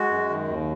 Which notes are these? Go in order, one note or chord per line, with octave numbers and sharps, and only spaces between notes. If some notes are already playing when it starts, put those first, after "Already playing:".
Already playing: G#3 F#4
F#2
D#3
D#2